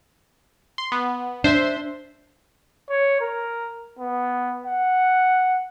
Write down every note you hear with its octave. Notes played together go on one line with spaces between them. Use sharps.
C6
B3
D4 C5 E5 C6
C#5
A#4
B3
F#5